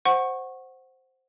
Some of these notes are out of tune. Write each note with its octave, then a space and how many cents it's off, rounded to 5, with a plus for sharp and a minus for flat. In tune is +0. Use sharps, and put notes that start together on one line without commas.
C5 +0 F#5 +0 C#6 -20